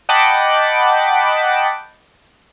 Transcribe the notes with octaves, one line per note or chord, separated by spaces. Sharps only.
D#5 F#5 G5 A5 B5 D6